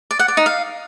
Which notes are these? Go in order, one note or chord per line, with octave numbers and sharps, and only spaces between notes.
D5
F#5
D5
D#4
F5